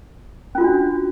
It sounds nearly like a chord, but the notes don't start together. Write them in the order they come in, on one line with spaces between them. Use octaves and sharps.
C#4 F4 F#4 D4